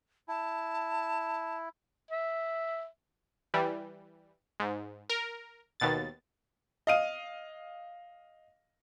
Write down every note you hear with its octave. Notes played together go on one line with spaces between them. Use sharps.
E4 A5
E5
E3 G3
G#2
A#4
D#2 B2 A6
D#5 F5 D#7